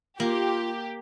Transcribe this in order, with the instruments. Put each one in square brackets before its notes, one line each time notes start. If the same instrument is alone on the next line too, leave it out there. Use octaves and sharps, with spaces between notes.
[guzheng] A#3 [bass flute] F4 [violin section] G4